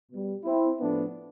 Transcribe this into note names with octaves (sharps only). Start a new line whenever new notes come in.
B2 G3
C4 E4
A2 F3 A3 B3 D4